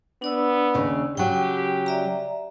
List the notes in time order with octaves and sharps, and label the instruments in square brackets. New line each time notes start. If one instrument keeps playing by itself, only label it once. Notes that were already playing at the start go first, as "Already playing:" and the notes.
[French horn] B3 [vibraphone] D4 D5 E6
[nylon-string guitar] D#2 C#3
[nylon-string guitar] C#3 F#3 [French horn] G4 [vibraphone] G5
[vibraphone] D5 E5 A#5